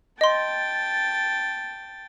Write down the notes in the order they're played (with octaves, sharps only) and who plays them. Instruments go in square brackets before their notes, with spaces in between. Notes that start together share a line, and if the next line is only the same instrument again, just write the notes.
[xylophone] D#5 C6 [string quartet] G5 A5 A6